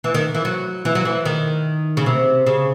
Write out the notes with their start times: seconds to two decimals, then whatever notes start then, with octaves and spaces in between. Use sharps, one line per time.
0.04 E3
0.14 D#3
0.35 E3
0.45 F#3
0.85 E3
0.95 F#3
1.05 E3
1.25 D#3
1.97 C#3
2.06 C3
2.46 C#3